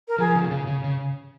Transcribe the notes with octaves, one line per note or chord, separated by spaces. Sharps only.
A#4
F3 G#4
C#3
C#3
C#3
C#3